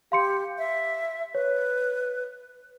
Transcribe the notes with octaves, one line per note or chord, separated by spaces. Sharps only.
G4 F5 C6 C#7
E5
B4 C#5